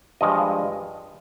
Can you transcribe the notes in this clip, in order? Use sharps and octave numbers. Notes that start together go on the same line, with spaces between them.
G2 F3 G#3 D#5